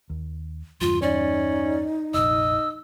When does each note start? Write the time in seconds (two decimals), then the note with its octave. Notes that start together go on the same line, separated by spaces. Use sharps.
0.10 D#2
0.81 E2 G2 C#3 F4
1.02 C#4 D#4 D5
2.14 F1 A#1 D#5 E6